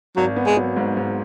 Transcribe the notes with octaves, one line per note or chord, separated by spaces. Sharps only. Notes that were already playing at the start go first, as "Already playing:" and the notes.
G#1 F#3
B3
G#3
F#3
G#2
G#2